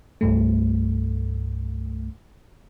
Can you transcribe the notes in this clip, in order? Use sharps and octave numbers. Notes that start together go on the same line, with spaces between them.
C2 G2 A3